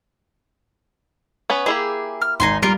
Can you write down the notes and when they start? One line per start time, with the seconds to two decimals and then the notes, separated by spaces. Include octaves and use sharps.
1.50 B3 C#4 B4
1.66 A#3 E4 G4 G#4
2.22 F6
2.40 G#1 D#4 G#5 C6
2.62 G3 A#3 F4 A#4